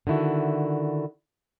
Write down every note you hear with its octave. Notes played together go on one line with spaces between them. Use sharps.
D3 D#3 E4 F#4